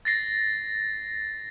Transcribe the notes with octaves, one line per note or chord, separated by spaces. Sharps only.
A6 A#6 C7